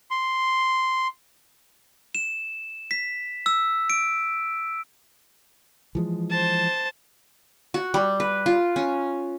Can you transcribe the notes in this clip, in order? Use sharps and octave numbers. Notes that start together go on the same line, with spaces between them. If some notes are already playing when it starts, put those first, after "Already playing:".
C6
E7
B6
E6
D7
E3 F3 G#3
C5 A5
F#4
G3
B4
F4
C#4